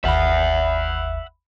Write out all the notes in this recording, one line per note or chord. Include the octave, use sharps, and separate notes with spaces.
G1 D#2 E5 F#5 B5